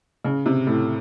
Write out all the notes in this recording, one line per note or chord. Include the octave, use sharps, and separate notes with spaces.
C#3
C3
A2